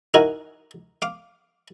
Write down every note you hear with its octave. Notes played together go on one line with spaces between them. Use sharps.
D#4 E4 F#4 A#4 D#5 G#5
F5 D6